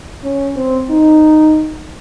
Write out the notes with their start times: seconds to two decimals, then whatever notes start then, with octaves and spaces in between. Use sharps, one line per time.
0.24 C#4
0.56 C4
0.90 D#4